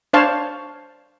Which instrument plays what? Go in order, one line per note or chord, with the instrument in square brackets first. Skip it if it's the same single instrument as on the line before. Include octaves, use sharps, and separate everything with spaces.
[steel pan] D4 C5 C#5 F5 A5